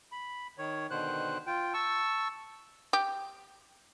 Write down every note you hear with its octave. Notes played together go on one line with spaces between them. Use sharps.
B5
D#3 C#5
B2 D3 D#3 C5 F#6
F4 G5
A5 C#6 E6
G4